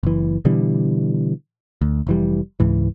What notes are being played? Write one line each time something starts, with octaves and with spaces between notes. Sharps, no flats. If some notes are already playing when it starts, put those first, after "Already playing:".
F#1 E3
B2 D3 E3 G3
D2
F1 E3 G3
C#2 G#2 E3